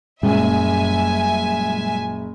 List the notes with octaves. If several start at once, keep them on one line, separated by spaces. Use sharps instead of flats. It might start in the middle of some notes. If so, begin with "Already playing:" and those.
F#1 F#2 A#2 G3 G#3 E5 G#5